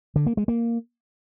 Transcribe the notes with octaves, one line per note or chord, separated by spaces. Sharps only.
D3
A#3
G#3
A#3